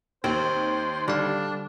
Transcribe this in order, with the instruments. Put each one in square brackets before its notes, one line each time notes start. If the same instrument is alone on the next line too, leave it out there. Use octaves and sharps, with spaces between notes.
[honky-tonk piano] D#2 [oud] C4 [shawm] C5
[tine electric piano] D3 F5 [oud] G3 [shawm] D4